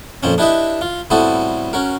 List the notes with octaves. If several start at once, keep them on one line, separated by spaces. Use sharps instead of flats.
F2 A#2 C4 C#4
D4 E4 G4 B4 D#5 E5
F4
A2 G3 B3 C4 F#4 A4
C#4 F#4 A#4